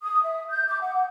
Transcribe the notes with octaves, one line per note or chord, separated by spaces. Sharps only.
D#6
E5
G6
D6
F#5